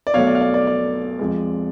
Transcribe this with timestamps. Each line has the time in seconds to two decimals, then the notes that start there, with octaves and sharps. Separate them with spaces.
0.07 D5
0.14 B1 B2 A3 C#5 F5
0.27 D5
0.35 F5
0.41 D5
0.54 D5
0.67 D5
1.19 F2 F3 G#3